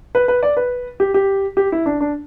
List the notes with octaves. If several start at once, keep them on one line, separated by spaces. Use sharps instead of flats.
B4
B4
D5
B4
G4
G4
G4
E4
D4
D4